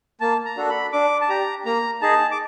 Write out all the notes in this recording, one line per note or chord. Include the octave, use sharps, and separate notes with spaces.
A#3 A5
A#5
D4 F#4 A4
B5
D4 D6
A5
G4 A#5
A#3 A#5
D#4 G#4 A5
D6